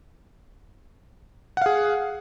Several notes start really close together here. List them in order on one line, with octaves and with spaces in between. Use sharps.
F#5 F5 G#4